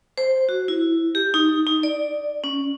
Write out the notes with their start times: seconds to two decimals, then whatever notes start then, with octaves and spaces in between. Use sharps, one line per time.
0.18 C5
0.49 F#4
0.68 E4
1.15 G4
1.34 D#4
1.67 D#4
1.83 D5
2.44 C#4